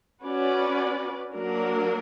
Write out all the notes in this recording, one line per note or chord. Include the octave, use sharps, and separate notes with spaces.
C#4 F#4 B4 D5
F#3 A#3 D4 F#4 A#4